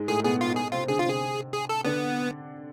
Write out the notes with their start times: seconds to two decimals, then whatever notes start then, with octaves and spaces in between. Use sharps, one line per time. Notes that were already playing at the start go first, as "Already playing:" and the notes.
Already playing: G#2 G#3
0.08 A2 A3 G#4
0.24 B2 B3 G#4
0.41 F4
0.56 G#4
0.72 C3 C4 F4
0.88 D3 D4 G#4
0.99 F4
1.05 C3 C4 G#4
1.53 G#4
1.69 A4
1.85 D3 B3 D4